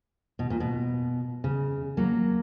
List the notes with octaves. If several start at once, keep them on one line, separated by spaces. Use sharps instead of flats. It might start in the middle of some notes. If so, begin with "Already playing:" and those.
B2
A#2
B2
C#3
F#3 A#3